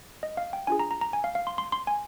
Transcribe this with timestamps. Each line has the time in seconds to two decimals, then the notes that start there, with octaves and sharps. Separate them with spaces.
0.23 D#5
0.37 F5
0.53 G5
0.67 D4 F4 G#4 G#5
0.79 A#5
0.91 A#5
1.01 A#5
1.13 G#5
1.24 F5
1.35 F5
1.47 C6
1.58 C6
1.72 C6
1.87 G#5